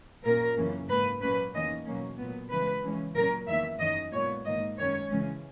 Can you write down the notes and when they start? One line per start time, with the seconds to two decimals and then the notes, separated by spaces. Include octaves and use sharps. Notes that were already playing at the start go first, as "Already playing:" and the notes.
0.25 A#2 A#3 C#4 A#4
0.56 F#2 C#3 E3 A#3 C#4
0.89 G#2 F#3 A#3 B4
1.22 A#2 F#3 A#3 C#4 B4
1.54 E2 D#3 A#3 C#4 D#5
1.86 B2 F#3 A#3 C#4
2.18 A#2 F#3 B3
2.51 C#3 E3 G#3 B4
2.83 C#3 E3 G#3 C#4
3.16 A#2 F#3 C#4 A#4
3.47 E2 D#3 A#3 E5
3.80 F#2 D#3 F#3 C#4 D#5
4.12 A#2 G#3 B3 C#5
4.45 G#2 D#3 A#3 D#5
4.77 F#2 D#3 G#3 C#4 C#5
5.10 C#3 E3 G#3 C#4